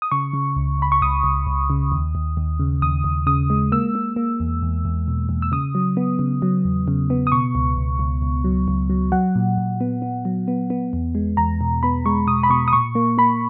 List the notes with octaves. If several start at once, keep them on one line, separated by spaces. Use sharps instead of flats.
D#6
C#3 C#6
C#3
C#2
C#2 B5
C#6
C#2 D#6
C#2
C#2
C#3
D#2
D#2
D#2
C#3
D#2 D#6
D#2
C#3 D#6
G#3
A#3 E6
A#3
A#3
E2
E2
E2
B2
E2
E6
C#3 D#6
F#3
B3
C#3
F#3
E2
C#3
B3
D#6
B2 C#6
C#2
C#2
C#2
C#2
F#3
C#2
F#3
F#3 F#5
A#2
A#2
B3
B3
F#3
B3
B3
E2
G#3
E2 A#5
B2
B3 B5
G#3 C#6
B2 D#6
B5
B2 C#6
D#6
A#2 C#6
A#3
A#3 B5